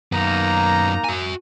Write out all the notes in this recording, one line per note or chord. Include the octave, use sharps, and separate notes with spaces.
F#2 A#3 B3 D#4 A#5
F#4 G#5